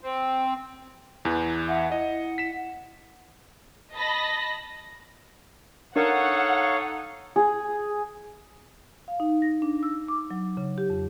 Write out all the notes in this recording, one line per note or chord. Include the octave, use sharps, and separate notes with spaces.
C4
E2 E3
E5 F#5
E4 D#5
B6 E7
D#5 A5 B5 A#6
D4 D#4 A4 A#4 C#5 F5 F#5 C#6
G#4
F5
D#4
A#6
D4
E6
D6
F#3
C#3
G4
F2